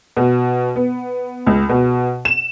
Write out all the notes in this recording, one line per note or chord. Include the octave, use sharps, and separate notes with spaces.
B2
B3
C#2
B2
E7